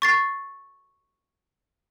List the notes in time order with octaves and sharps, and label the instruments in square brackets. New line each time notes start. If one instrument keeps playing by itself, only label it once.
[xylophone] C#6 A6 C7